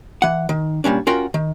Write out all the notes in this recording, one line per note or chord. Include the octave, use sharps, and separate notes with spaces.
E3 F#5
D#3
A#2 G3 C#4 D4
C#4 F4 F#4 A#4 G5
D#3